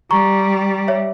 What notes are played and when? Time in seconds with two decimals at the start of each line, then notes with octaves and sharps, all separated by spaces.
0.11 G3 A#5 C#6
0.88 C#5 E5